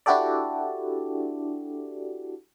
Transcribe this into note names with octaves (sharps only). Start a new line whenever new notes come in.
D4 E4 F#4 G4 A4 D5